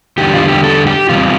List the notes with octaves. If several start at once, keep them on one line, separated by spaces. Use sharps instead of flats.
E2 D3 G3 G4
F4
G4
A4
G4
E2 C3 G3 F4